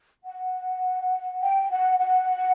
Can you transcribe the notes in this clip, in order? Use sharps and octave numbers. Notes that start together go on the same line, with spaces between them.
F#5
G5
F#5
F#5